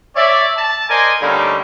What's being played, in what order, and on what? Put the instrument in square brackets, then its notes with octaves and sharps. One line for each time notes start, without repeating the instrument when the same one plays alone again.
[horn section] C#5 D5 E5
A5
A#4 C5 D5 D#5 G#5
D3 G3 A3 A#3 C#4 D#4